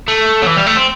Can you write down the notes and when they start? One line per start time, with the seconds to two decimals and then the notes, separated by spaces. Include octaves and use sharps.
0.08 A3
0.42 F#3
0.47 E3
0.57 G3
0.67 A3
0.77 C4